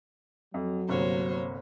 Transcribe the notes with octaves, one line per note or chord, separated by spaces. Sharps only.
F2 F#3
G1 C2 A#3 C5 C#5